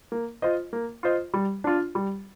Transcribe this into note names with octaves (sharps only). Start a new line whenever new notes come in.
A#3
F4 C5 D#5
A#3
F4 C5 D#5
G3
D4 F4
G3